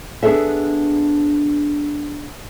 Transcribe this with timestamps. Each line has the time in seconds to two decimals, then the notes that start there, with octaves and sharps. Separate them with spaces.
0.23 B3 D4 G#4 A4 E5